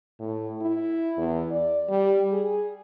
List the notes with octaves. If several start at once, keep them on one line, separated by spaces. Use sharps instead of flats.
A2
E4
E2
D5
G3
G#4